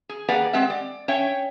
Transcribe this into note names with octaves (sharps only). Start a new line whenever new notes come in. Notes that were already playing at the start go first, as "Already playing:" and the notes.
G#4
A#3 G4 G#4 B4 D5 F#5
G#3 C4 G4 E5 F#5
D5
C#4 C#5 E5 G5